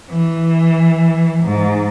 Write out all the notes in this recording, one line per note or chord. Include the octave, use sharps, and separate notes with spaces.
E3
G#2